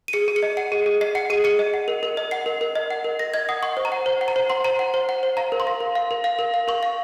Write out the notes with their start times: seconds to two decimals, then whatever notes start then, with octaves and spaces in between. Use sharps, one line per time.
0.08 D#7
0.13 G#4 C#7
0.28 G#4
0.36 C#7
0.43 D#5
0.57 F#5 C#7
0.72 G#4
0.86 G#4
1.01 D#5 C7
1.15 F#5 C#7
1.30 G#4 D#7
1.44 G#4 C#7
1.59 D#5
1.74 F#5
1.88 A#4
2.03 A#4
2.17 D#5
2.31 F#5 C7
2.46 A#4
2.61 A#4
2.75 D#5
2.91 F#5
3.04 A#4
3.19 A#4 A#6
3.34 D#5 G#6
3.49 F#5 D#6
3.63 F#5 C#6
3.77 C5
3.85 A#5
3.92 F#5
4.06 C5
4.21 F#5
4.28 A#5
4.36 C5
4.50 F#5 C6
4.64 C5 A#5
4.79 F#5
4.94 C5
5.09 F#5
5.23 C5
5.37 F5 A#5
5.52 A#4
5.60 C6
5.67 F5
5.80 A#4
5.95 F5
6.11 A#4
6.24 F5
6.39 A#4
6.54 F5
6.68 A#4 C#6
6.83 F5